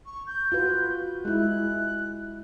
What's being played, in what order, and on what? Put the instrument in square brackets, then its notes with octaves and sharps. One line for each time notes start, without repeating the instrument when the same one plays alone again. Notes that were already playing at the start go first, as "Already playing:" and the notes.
[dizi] C#6
G6
[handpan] F4 F#4 B4
[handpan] G#3 E4 [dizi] F#6